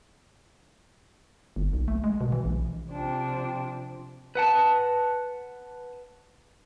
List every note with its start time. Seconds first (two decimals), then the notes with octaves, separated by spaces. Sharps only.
1.56 G1
1.73 B1
1.88 A3
2.04 G#3
2.21 B2
2.32 E3
2.45 A#1
2.90 C3 F3 C4 D4
4.35 B4 F#5 A5